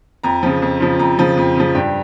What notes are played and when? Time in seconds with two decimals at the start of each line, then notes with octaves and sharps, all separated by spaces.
0.23 F2 A#5
0.43 C#3 F3
0.62 F2
0.80 C#3 F3
0.99 F2 A#5
1.18 C#3 F3
1.37 F2
1.56 C#3 F3
1.75 G2 G5